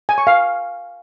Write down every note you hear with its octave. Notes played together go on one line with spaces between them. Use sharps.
G#5
C#6
F5